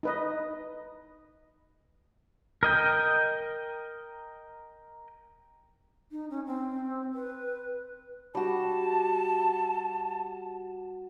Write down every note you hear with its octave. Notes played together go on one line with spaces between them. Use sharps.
D#4 B4 D#5
A#4 D#5 G5
D#4
C#4
C4
B4
G3 F#4 A5